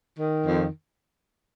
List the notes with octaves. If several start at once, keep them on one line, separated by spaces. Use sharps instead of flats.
D#3
F2